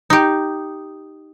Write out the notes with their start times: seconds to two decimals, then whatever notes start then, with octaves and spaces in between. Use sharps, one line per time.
0.10 D#4 G4